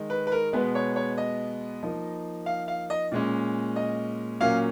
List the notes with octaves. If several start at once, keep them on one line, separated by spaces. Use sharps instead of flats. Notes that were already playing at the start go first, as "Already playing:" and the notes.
Already playing: D#3 G#3 D#4
B4
B4
A#4
B2 G#3 B3 B4
C#5
C#5
D#5
F3 A#3 D#4
F5
F5
D#5
A#2 G#3 C#4
D#5
A#2 F#3 A#3 C#4 F5